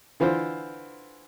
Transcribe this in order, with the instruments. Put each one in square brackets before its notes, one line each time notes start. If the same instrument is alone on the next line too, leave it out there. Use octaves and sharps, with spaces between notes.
[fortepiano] D3 E3 F4 C5